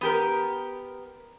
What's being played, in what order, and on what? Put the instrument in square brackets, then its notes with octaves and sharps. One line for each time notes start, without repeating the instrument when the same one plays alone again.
[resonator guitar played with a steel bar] B3 G4 A#4